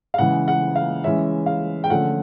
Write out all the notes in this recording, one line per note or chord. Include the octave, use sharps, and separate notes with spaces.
F5
C#3 E3 G#3 F#5
F#5
F5
E3 G#3 C#4 E5
F5
G5
D3 F3 A3 C#4 F#5